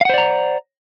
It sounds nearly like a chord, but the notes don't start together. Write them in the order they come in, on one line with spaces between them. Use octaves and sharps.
F5 F#5 C5 D5 A#5